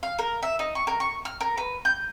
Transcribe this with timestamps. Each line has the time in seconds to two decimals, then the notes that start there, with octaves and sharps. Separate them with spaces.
0.03 F5
0.19 A#4
0.43 E5
0.59 D#4
0.75 C#6
0.87 A#4
1.00 C#6
1.25 F6
1.41 A#4
1.58 B4
1.85 G6